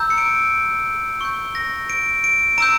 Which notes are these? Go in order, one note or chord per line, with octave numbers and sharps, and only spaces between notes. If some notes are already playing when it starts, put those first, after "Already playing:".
Already playing: A#5 E6 G6
C#7
D7
C#6 G6
A#6
D7
D7
A#5 E6 G6 D7